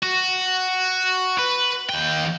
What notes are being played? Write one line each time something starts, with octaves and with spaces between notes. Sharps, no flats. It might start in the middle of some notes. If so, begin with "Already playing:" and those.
F#4
B4
D#2 G5